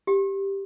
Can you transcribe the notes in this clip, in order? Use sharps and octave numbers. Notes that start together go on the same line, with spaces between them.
G4